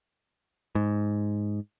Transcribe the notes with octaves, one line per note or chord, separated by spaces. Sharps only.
G#2